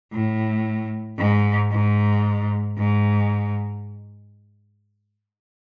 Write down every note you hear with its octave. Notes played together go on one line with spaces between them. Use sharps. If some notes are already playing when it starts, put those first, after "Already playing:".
A2
G#2
G#2
G#2